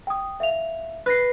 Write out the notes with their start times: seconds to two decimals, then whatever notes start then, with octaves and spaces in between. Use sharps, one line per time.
0.07 G5 D#6
0.40 E5 F5 F7
1.06 B4 F#6 A#6 C7